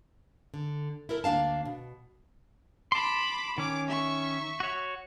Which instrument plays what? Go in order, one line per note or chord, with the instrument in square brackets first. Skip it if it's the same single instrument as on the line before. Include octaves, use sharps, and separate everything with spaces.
[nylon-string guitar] D3
E4 A4 A#4
D2 A#3 D4 F5 A5
B2
[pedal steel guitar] A5 C6 [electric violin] B5 D6
[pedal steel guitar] D#3 C#4 [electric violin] D6
[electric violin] E5 C#6
[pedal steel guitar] F#4 C#5